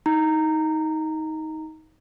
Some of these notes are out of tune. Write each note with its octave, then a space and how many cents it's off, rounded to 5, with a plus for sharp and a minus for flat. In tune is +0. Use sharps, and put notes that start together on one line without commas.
D#4 +20 A#5 -15